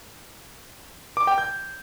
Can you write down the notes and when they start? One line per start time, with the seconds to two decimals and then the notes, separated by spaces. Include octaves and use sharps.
1.17 D6
1.27 G5
1.38 G6